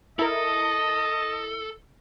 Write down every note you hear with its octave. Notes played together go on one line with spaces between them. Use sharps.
E4 A4 A#4 D#5